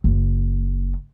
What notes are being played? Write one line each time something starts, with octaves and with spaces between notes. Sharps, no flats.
F#1